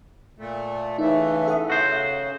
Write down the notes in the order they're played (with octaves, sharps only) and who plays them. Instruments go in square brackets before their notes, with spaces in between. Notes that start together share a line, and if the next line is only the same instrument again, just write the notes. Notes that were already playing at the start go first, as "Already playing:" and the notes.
[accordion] A#2 A3
[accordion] C#3 E3 A3 [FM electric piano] D#4 [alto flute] E5
[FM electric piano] A4 F#5 D#6
[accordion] C#3 [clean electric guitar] F#4 C5